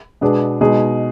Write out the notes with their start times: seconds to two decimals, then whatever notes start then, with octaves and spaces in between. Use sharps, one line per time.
0.21 B2 G#3 B3 D4 G#4
0.61 B2 G#3 D#4 G#4